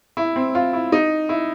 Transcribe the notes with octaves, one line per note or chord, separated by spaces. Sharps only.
E4
C4
F4
E4
D#4
E4